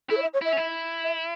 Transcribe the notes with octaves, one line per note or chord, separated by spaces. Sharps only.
E4 A4
C#5
E5
C#5
E4 E5
C#4
E4
E5